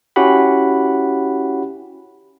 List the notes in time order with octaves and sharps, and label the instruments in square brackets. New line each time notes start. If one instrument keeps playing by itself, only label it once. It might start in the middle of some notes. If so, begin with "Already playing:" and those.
[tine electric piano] C#4 E4 F#4 G4 F#5 B5